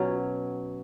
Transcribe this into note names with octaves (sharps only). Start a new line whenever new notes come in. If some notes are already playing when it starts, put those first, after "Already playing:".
Already playing: B2 F#3 C#4